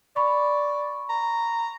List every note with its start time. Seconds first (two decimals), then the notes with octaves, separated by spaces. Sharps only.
0.16 D5 B5 C#6
1.10 A#5